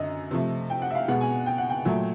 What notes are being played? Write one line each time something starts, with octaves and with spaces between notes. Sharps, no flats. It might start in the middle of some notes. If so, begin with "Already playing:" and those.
Already playing: F#2 D3 D#5
C3 F3 A3
G5
F#5
E5
F5
B2 G#3 F#5
G#5
G5
F#5
G5
A#2 F#3 A3